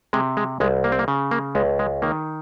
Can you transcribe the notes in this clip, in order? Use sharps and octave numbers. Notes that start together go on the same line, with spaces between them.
C3 G#3
G#3
C2 G#3
A#3
C4
A#3
C#3
A#3
C#2 G#3
G#3
D#3 A#3